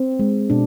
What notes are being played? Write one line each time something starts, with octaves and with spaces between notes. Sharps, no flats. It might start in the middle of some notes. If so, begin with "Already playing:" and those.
Already playing: C4
G#3
B2 D4